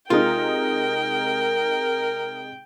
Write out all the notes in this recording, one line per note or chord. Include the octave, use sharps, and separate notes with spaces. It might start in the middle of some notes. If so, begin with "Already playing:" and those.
C3 G#3 D#4 F4 A#4 G5